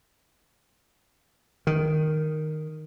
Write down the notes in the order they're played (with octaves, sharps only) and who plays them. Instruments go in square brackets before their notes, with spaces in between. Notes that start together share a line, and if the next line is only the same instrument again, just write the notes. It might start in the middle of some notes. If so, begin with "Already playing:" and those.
[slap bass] D#3